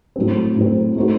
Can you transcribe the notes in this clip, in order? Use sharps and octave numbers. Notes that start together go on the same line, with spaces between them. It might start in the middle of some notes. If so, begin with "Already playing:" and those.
A2 F#3 C4
A2 F#3 C4
A3 D#4 F#4 C5